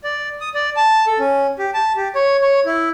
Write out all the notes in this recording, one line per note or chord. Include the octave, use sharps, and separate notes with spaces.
D5
D#6
D5
A5
A4
C#4
G4
A5
G4
C#5
C#5
E4